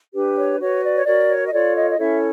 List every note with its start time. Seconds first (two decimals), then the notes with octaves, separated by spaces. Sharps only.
0.13 D4 G4 B4
0.37 C#5
0.60 F#4 B4 C#5
0.83 D5
0.95 C#5
1.06 F#4 A#4 C#5 D5
1.29 C#5
1.45 D#5
1.52 F4 A4 C#5 D5
1.76 D#5
1.91 D#5
1.98 C#4 E4 A4 C#5 E5